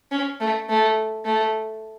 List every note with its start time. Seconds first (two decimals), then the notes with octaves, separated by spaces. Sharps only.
0.11 C#4
0.40 A3
0.69 A3
1.25 A3